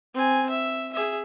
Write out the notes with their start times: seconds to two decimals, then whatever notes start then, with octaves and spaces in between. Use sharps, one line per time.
0.14 C4 G#5
0.50 E5
0.93 G#4 E5